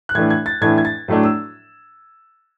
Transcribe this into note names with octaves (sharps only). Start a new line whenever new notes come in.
F#6
A2 E3 A3 D4 G#6
G#6
A6
A2 E3 A3 D4 G#6
G#6
A6
A2 F#3 A3 D4
E6